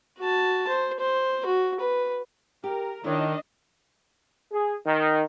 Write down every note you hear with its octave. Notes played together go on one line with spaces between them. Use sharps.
F#4 A5
C5
C5
F#4
B4
G4 A#4
D#3 D4 E4 A#4 C#5 D#5
G#4
D#3